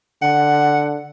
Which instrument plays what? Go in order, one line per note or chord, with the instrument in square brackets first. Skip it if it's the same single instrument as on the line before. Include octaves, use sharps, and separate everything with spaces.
[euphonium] D3 [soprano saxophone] F#5